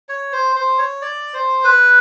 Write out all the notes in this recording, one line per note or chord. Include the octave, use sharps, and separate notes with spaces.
C#5
C5
C5
C#5
D5
C5
B4